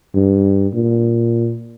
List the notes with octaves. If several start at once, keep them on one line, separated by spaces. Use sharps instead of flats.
G2
A#2